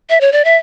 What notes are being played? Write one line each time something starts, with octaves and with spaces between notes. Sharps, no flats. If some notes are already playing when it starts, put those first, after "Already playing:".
E5
C#5
D5
E5